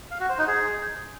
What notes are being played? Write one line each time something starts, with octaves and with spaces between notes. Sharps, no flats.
F5
F#4
C5
D#4
G#4